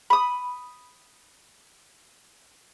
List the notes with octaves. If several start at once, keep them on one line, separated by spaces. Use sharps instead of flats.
B5 D#6